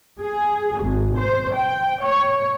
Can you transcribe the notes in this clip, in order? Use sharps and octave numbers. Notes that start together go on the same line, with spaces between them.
G#4
G#1
C5
G5
C#5